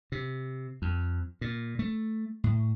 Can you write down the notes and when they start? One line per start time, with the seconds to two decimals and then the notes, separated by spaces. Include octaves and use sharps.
0.12 C3
0.82 F2
1.41 A#2
1.79 A3
2.44 A2